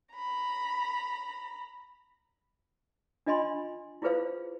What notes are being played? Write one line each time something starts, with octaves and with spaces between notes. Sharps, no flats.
A#5 B5
D4 F4 D#5 G#5 B5 C6
E4 F4 G#4 B4 C5 F5